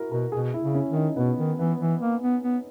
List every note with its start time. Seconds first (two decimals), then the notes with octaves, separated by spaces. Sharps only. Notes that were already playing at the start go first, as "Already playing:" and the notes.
Already playing: E4 F#4 A#4
0.11 B2 A#4
0.32 B2 G#4
0.54 E4
0.61 C#3
0.74 C#4
0.89 D#3
0.96 D#4
1.17 B2 B3
1.38 D#3
1.59 E3 B3
1.80 E3
2.01 A#3
2.22 B3
2.43 B3